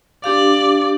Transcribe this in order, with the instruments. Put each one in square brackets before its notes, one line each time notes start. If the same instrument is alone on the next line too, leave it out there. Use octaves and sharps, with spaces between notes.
[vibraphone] D4 G4 F5 [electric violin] D5